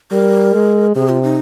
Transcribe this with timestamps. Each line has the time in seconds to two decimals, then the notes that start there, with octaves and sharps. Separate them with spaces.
0.11 G3 A#4
0.53 G#3
0.95 C3 G#4
1.09 F4
1.23 D#4